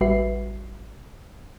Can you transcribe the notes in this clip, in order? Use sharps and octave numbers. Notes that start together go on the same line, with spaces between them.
A1 G3 F#4 B4 E5 C7